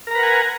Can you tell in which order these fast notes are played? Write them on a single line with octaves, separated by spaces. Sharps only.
A#4 A#5 B4 F#5 G#5